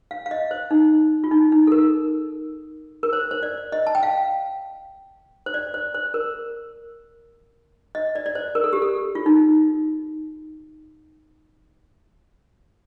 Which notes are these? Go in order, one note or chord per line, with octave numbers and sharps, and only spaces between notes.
F5
F5
D#5
C5
D#4
F4
D#4
D#4
A4
A#4
A#4
C5
C5
D5
D#5
A5
G5
F5
C5
D5
C5
C5
A#4
D#5
D5
D5
C5
A#4
A4
G4
A4
F4
D#4